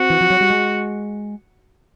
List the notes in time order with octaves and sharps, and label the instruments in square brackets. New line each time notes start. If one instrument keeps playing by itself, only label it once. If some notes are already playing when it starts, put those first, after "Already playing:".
Already playing: [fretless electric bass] C4 [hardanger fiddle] F#4
[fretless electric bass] E3
F3
F#3
G3
G#3